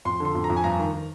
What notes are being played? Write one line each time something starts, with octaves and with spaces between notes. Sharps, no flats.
F2 C6
D3
C6
F2
A#5
F2
G#5
G2 A#5
D#3
D#3